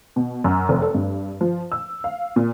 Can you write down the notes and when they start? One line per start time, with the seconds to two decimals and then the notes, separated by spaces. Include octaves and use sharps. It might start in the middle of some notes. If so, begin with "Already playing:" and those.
0.16 B2
0.44 F#2
0.69 F1
0.82 A4
0.95 G2
1.41 F3
1.72 E6
2.04 F5
2.36 A#2